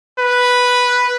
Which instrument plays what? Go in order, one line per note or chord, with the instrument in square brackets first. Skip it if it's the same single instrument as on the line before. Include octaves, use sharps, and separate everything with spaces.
[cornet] B4